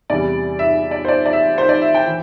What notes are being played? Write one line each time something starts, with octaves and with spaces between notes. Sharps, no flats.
E2 C3 E3 G3 D5
E5
D5
C5
D5
D5
E5
C5
D5
E5
G5
E3